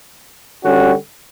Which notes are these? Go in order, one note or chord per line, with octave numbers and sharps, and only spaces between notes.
D3 G3 C#4 F#4